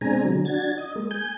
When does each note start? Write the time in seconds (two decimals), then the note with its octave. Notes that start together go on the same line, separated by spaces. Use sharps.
0.01 B2 G#3 C4 D4 G#5 A#5
0.24 D3 F#3
0.45 D4 F#4 G#6 A6
0.78 D#5
0.95 G#3 A#3
1.11 G#5 G6